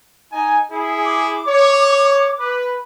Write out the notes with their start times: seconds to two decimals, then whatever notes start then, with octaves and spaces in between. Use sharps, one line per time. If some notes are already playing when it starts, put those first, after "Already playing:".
0.32 D#4 G#5
0.71 E4 G#4
1.05 D6
1.48 C#5
2.40 B4